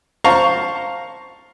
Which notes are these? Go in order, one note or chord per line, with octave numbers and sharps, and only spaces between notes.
C5 F5 A5 A#5 C#6